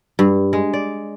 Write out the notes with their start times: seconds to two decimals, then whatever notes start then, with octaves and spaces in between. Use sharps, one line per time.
0.19 G2
0.53 G#3
0.74 D5